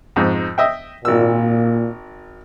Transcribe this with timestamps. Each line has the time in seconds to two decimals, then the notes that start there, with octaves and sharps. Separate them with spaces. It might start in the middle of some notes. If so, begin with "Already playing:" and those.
0.16 F2 G#2
0.58 D#5 E5 G5
1.05 G#1 A#2 E6